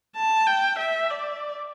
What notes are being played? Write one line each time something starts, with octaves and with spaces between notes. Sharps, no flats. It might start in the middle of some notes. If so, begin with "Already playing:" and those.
A5
G5
E5
D5